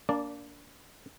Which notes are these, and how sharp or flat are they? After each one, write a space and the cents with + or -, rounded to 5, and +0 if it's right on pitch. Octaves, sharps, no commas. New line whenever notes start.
A#3 +0 D4 -25 D5 +0